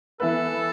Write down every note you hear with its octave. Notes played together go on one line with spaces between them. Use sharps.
E3 B3 E4 A4 B4